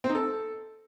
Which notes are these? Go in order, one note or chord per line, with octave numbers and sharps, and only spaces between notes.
C4
D#4
A4